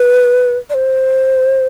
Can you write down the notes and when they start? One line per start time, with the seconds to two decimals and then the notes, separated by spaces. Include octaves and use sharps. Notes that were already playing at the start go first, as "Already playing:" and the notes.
Already playing: B4
0.70 D5
0.74 C5